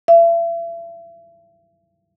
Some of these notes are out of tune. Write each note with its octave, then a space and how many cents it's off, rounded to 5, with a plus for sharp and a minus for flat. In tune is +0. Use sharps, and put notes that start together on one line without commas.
E5 +40